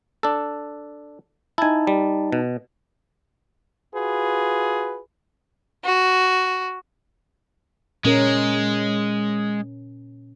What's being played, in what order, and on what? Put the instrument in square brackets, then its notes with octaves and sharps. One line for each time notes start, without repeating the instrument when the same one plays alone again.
[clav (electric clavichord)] D4 A4
[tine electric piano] D#4 A5 [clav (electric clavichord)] E4 G#5
[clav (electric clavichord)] G3
B2
[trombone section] F4 F#4 G#4 B4
[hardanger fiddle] F#4
[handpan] A#2 C#4 A#4 [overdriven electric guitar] G#3